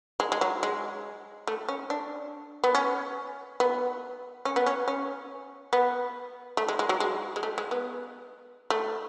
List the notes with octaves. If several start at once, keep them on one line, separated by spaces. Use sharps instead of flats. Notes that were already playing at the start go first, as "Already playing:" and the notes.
G#3
G#3
F#3
G#3
A3
C#4
D4
B3
C#4
B3
C#4
B3
C#4
C#4
B3
A3
G#3
G#3
F#3
G#3
G#3
A3
G#3
B3
A3